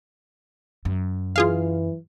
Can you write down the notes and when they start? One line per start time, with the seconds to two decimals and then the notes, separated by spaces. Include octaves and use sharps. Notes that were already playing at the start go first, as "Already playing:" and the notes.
0.85 F#2
1.36 E3 F4 G#4 F5